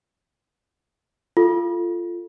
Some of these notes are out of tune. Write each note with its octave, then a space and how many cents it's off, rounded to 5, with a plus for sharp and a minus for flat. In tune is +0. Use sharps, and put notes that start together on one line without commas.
F4 -15 A4 +0